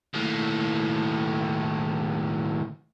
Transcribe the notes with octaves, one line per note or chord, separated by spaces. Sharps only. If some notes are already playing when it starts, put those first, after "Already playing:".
D#2 A2